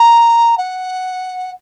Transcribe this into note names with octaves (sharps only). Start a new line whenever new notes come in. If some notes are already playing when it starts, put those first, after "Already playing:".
Already playing: A#5
F#5